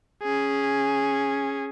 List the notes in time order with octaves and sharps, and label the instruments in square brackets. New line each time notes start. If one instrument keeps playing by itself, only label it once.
[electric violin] C#4 G#4